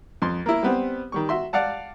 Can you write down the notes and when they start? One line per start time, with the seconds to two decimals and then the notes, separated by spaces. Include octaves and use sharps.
0.22 F2 C6
0.46 A#3 E4
0.63 G3 B3 C4
1.12 D#3 G3 C#6
1.29 F#4 E5 C6
1.53 D5 F5 F#5 A5